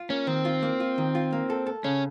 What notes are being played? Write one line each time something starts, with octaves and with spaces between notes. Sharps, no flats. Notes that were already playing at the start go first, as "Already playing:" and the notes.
Already playing: F4
A#3 C#4
D#3 C4
F4
A#3
F4
D#3
F4
A#3
A4
A4
C#3 C#4